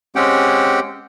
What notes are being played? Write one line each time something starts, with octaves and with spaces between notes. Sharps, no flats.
G#3 C4 C#4 G4 F#5 G5